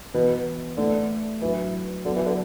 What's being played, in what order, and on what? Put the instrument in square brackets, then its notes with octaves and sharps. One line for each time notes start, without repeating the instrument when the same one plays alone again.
[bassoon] B2 [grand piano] E3 B3 E4
[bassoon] D3 [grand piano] A3 E4 B4
[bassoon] E3 [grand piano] F#3 D4 F#4 B4
[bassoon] D3 [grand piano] F#3 B3 F#4 B4
[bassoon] E3
D3